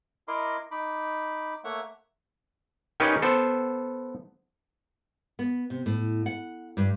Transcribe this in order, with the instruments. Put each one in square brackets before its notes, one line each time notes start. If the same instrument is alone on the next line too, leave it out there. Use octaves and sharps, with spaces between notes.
[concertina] E4 A#4 D#5 C6 D6
D#4 B5 D6
A3 A#3 C#5 E5 F#5
[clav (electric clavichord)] D#3 C#4 D#4 G4 B4
B3 A4 C5
[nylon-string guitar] B3
C3
A2
F#5
G2